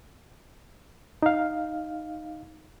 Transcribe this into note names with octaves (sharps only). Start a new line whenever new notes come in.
D#4 F5